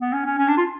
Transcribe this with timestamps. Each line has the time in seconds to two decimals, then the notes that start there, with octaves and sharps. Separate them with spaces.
0.01 B3
0.13 C#4
0.26 C#4
0.38 C#4
0.48 D4
0.57 F4